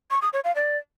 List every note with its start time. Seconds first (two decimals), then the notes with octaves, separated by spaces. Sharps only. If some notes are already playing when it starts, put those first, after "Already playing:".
0.11 C#6
0.22 D#6
0.33 C#5
0.44 F5
0.55 D5